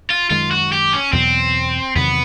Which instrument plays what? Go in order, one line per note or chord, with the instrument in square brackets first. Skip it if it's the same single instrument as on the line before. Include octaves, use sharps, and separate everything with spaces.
[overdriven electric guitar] F4
[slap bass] F#2 D#3 G#3 [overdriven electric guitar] F4
[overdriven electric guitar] F#4
G4
C#4
[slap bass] E2 B2 F#3 [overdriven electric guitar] C4
[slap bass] E2 C3 D#3 F#3 [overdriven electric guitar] B3